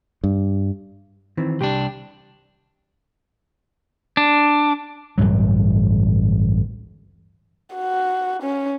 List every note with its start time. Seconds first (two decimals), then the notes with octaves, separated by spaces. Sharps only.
0.24 G2
1.37 D#3 E3 C4
1.61 C2 D4 G4
4.17 D4
5.18 A1 D2 G2 F#3
7.76 F#4
8.43 C#4